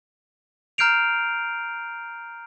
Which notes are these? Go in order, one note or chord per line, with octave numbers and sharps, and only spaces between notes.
A#5 F6 G6 C7 D7 F7